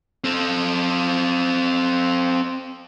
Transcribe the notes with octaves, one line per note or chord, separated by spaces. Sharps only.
C4 A4